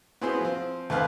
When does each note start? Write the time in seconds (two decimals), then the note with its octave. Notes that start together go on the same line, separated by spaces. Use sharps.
0.21 B3 C4 E4 F#4 G#4 C5
0.41 F3 C4
0.90 D#2 A3 B3 C4 B4 F5